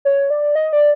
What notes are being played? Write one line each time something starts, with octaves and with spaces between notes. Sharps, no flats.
C#5
D5
D#5
D5